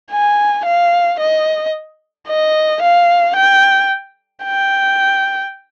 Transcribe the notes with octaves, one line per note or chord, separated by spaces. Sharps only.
G#5
F5
D#5
D#5
F5
G5
G5